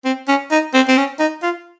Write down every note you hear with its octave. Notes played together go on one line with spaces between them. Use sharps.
C4
C#4
D#4
C4
C4
C#4
D#4
F4